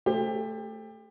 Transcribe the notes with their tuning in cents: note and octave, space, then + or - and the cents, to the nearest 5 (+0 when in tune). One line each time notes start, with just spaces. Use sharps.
A3 +0 G4 +30 C5 +0